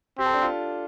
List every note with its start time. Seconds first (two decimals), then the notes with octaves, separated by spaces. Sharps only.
0.19 C4 G4
0.26 A4
0.34 D4 G4
0.41 F4 A4